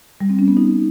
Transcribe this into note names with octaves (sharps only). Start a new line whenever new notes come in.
G3
C4
C#4
B3
D#4